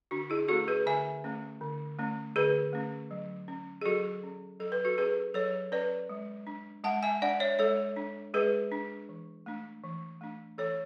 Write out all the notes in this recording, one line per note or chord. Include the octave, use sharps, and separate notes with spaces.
D3 D4 F#4
E4 G#4
A3 C#4 F#4 A4
G#4 B4
D3 E5 G#5
A3 C#4
D3
A3 C#4
D3 G#4 B4
A3 C#4
F#3
C#4
G#4
F#3 F#4 A4
C#4
F#3 A4
B4
F#4 A4
C#4 G#4 B4
F#3 A4 C#5
C#4 B4 D5
G#3
D4
G#3 F#5 A5
E5 G#5
D4 D5 F#5
C#5 E5
G#3 A4 C#5
D4
G#3 G#4 B4
D4
E3
A3 D4
E3
A3 D4
E3 A4 C#5